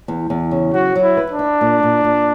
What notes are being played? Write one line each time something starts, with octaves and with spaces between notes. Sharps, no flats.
E2
E2
C#3
F#3 F#4
F#3
E4
B4
D4
E4
A#2
A#2
A#2